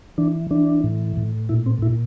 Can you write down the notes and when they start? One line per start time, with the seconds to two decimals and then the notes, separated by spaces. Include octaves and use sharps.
0.18 E3 D4
0.51 E3 D4
0.84 A2
1.17 A2
1.49 A#2 E4
1.66 C4
1.82 A#2 E4